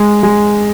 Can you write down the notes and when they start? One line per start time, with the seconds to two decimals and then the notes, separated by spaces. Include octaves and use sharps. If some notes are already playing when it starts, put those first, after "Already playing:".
Already playing: G#3
0.23 G#3